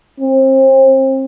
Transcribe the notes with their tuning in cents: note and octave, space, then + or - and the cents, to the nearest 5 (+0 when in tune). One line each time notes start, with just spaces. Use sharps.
C4 +30